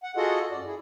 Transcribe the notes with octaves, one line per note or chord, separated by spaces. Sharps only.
F#5
F4 F#4 G#4 A4 D#5 F#5
F#2 D5
E4 G#4